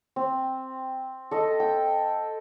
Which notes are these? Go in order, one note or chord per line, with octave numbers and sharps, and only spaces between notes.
C4
A4 D#5
G5